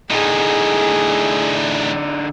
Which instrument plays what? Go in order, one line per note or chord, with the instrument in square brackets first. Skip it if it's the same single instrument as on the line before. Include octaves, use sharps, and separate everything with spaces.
[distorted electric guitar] E2 A2 [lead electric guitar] D3 D#4 [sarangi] G#4